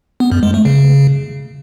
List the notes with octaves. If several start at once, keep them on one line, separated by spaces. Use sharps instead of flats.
B3
F#2
G#3
A3
C#3